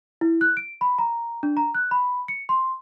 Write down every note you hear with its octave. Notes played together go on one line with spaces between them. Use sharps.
E4
F#6
D7
B5
A#5
D4
A#5
F#6
B5
C#7
C6